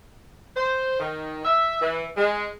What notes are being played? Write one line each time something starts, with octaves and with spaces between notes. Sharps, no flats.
C5
D#3
E5
E3
G#3